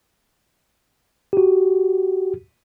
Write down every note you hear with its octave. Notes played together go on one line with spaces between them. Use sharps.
F#4 G4